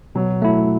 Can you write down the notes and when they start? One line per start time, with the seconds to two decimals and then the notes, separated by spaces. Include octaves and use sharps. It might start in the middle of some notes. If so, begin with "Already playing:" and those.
0.15 B2 F#3
0.42 A3 E4